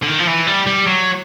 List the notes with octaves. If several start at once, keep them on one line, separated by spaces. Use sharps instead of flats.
D3
D#3
F3
E3
G3
G3
F#3